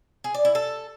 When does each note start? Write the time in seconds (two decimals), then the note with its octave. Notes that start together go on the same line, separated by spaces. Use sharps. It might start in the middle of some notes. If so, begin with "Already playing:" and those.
0.24 G#4
0.34 D5
0.45 E4
0.55 A4